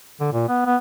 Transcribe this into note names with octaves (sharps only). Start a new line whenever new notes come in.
D3
A#2
B3
B3